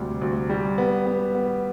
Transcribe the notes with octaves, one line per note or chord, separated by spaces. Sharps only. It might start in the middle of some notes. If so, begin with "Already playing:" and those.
Already playing: D2 C3 G3
D2
G3
B3
B3
B3